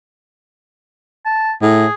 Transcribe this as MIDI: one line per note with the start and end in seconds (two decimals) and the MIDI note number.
1.25 1.53 81
1.62 1.86 45
1.62 1.94 68